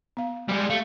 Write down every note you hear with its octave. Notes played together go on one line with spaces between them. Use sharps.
B3 F5
G3 G#3
A3 F5